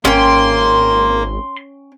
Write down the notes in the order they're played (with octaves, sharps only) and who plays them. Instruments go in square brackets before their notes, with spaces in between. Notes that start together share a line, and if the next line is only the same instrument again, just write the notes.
[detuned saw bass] G#1 [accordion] A#3 [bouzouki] C#4 G5 [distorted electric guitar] C6